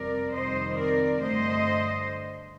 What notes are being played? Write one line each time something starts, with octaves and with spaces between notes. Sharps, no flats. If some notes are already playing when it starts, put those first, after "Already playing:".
Already playing: F2 C3 G3 A#4 D5
F2 C3 D#3 G3 C4 C5 D#5
A#4 D5
G2 D3 A3 C5 D#5